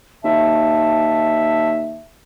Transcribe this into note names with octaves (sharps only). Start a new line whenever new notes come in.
D#2 E5 A5